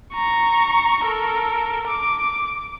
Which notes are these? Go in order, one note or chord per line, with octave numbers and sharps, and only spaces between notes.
A#5 C#6
A4 A#4
D6